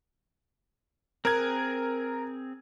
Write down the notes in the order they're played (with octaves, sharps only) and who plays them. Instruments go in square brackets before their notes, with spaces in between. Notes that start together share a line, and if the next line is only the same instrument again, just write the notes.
[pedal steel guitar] C4 G#4 F#6 [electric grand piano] A#4 G#6